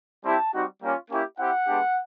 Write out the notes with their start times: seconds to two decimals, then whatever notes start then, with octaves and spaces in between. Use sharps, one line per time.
0.25 G3 C4 E4 G4 A5
0.53 G3 C4 D#4 F#4
0.82 G3 A#3 C#4 F4
1.11 A#3 C#4 E4 G4
1.39 C4 E4 G4 F#5
1.67 G#3 B3 D4 G4